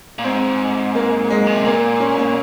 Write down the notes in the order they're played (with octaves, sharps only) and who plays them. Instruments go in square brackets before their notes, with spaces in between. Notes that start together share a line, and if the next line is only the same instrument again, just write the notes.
[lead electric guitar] A#2
[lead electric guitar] G#2 [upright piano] C4
[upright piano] A#3
G#3
[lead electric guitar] C#3
C3
[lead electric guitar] A#2 [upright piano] A#3
[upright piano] C#4
C#4